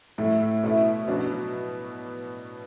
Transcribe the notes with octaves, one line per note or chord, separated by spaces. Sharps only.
A2 A3 E4
B2 A3 E4
B2 F#3 D4